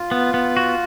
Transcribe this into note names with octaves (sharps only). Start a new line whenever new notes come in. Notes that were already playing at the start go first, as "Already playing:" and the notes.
Already playing: F4
B3
B3
F#4